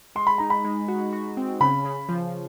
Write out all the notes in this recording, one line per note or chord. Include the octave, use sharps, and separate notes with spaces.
G#3 C6
B5
D#4 A#5
B5
G#3
F#4
F#4
C4
C#3 B5
C#3
F3